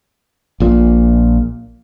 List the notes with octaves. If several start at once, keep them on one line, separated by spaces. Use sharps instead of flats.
A#1 A#2